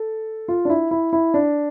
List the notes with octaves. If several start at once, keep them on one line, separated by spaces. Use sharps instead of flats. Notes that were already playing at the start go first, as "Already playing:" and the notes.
Already playing: A4
F4
D4
E4
E4
E4
D4